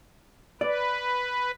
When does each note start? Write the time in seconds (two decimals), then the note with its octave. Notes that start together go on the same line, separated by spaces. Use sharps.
0.61 B4 D5